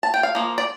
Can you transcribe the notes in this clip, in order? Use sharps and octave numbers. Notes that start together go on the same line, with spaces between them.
A5
G5
F5
F3 A#3
D5